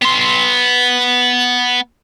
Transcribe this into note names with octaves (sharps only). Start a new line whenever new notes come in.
B3 C6